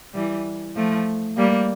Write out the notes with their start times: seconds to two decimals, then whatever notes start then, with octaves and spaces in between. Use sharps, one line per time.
0.14 E3 G3
0.76 F3 A3
1.37 G3 A#3